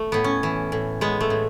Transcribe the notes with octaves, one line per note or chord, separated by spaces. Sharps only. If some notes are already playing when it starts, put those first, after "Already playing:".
Already playing: A3
A2 B3
C#4
E3
A2
G#3 B3
A3
A2